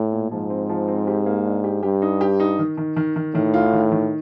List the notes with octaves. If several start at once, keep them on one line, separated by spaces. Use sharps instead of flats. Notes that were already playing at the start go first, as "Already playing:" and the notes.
Already playing: A2
A#2
G#2 F3
C4
F3
C4
G4
A#3
D4
G4
G2 G4
D#4
G4
D#4
D#3
D#3
D#3
D#3
A2 D#3
F4
D#3
D#3